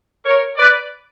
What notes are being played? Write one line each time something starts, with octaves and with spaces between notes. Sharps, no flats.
A#4 C#5
B4 D5